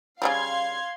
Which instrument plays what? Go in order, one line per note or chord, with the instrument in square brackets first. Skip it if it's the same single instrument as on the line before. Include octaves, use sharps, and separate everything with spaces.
[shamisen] C#3 E3 G3 [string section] F5 C6 G#6